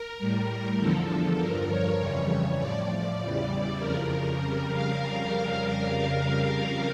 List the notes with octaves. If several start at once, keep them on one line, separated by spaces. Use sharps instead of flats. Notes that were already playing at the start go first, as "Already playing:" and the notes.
Already playing: A#4
A2 G3
E2 D3 F3 A4
A4
G2 F3 A#4
C#5
F2 C#3 E3 G3 C#5
A2 F3 D5
E2 C#3 E3 G3
F2 C#3 F3 A#4
A#4
F2 C#3 G3
F5